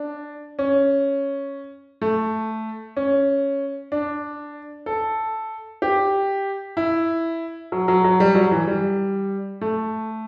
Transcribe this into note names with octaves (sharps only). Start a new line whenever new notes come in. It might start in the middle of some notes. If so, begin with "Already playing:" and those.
Already playing: D4
C#4
A3
C#4
D4
A4
G4
E4
F#3
F#3
F#3
G3
F#3
E3
G3
A3